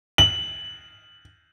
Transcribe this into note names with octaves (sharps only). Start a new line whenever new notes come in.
F#7